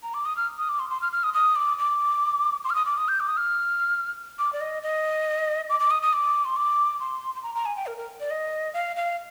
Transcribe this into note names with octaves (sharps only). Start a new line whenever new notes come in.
A#5
D6
D#6
F6
D#6
D6
C6
C6
F6
F6
D#6
D#6
D6
D6
C6
F6
D#6
D6
D#6
G6
D6
D#6
F6
D6
D5
D#5
D#5
D6
D6
D#6
D#6
D6
C6
D6
C6
C6
A#5
A#5
G#5
G5
A#4
A#4
D5
D#5
F5
F5